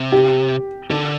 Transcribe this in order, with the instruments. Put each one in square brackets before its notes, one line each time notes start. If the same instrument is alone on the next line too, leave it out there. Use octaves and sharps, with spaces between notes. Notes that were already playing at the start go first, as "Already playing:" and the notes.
Already playing: [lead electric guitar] C3
[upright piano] G4
[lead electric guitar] D3 [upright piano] A4